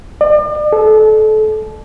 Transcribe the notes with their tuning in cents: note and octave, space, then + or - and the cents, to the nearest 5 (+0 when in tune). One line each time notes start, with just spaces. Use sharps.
D5 +40
A4 -30